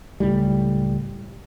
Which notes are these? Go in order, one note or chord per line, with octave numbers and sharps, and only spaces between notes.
C#2 A2 G3